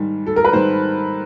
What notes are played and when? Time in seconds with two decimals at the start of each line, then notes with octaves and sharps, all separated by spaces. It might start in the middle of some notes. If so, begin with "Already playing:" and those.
Already playing: G#2 D#3 G3
0.26 A4
0.36 A#4
0.45 B4
0.53 G#2 D#3 G3 C5